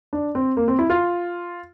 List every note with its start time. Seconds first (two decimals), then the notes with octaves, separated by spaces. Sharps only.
0.13 D4
0.35 C4
0.57 A#3
0.68 C4
0.79 E4
0.90 F4